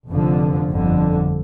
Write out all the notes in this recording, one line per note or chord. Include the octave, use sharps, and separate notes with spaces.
F1 F2 D3 F3
G1 F2 D3